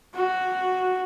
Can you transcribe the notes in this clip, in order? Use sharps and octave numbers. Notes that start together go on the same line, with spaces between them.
F#4